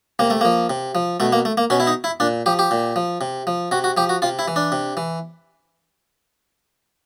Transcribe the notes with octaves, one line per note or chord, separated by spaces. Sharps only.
C3 A#3
A3
F3 A#3
C3
F3
B2 A3
A#3
A3
A#3
B2 C#4
E4
D#4
E4
A#2 D4
F3 G4
G4
A#2
F3
C3
F3
C3 F#4
F#4
F3 G4
F#4
C3 F4
E4
E3
D4
C3
E3